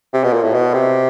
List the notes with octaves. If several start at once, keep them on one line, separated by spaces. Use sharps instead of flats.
C3
B2
A#2
A2
B2
C3